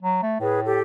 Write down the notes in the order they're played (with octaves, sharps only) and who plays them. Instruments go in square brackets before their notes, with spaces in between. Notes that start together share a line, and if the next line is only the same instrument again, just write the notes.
[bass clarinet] F#3
A3
[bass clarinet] A2 [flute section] G#4 B4
[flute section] G4 A4